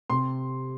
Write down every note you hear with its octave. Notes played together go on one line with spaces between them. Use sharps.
C3 C6